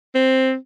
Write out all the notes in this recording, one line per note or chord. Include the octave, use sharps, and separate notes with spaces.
C4